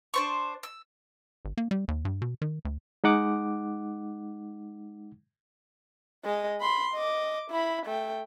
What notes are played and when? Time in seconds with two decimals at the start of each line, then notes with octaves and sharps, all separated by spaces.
0.14 D4 C5 C#6
0.63 E6
1.45 G#1
1.57 A#3
1.71 G3
1.88 D#2
2.05 G2
2.22 B2
2.42 D#3
2.65 D2
3.04 G#3 D#4 F#5 D6
6.24 G#3 D#5
6.60 B5 C6
6.94 D#5 D6
7.50 E4 B5
7.86 A3 G5